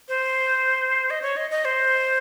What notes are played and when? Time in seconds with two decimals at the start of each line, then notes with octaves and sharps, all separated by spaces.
0.09 C5
1.10 D#5
1.22 C#5
1.37 D#5
1.51 D#5
1.65 C5